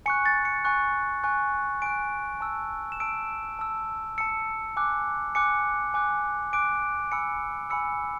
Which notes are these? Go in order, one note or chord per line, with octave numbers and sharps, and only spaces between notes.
G#5 C#6 F#6 C#7
A6
C#7
G#5 C#6 F#6
G#5 C#6 F#6
G#5 C#6 F#6 D7
A5 E6
E7
A5 E6 D7
A5 E6
A5 E6 C#7
G#5 D6 F#6
G#5 D6 F#6 C#7
G#5 D6 F#6
G#5 D6 F#6 D7
G#5 B5 E6 C#7
G#5 B5 E6 C#7